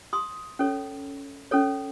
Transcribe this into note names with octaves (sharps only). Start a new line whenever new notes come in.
C6 D#6
C#4 A4 C#5
C#4 A4 C#5